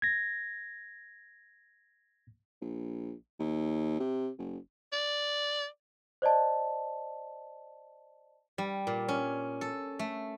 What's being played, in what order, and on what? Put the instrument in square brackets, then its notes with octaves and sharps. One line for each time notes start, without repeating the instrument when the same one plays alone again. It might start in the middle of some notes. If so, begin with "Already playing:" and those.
[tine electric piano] G#6 A#6
[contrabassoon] A#1
D#2
C3
F#1
[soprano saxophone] D5
[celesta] C5 D5 D#5 A5
[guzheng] G3
A#2
C#4
A4
A3